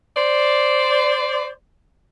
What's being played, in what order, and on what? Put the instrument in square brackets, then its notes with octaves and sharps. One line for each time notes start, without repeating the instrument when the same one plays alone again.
[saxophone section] C5 D5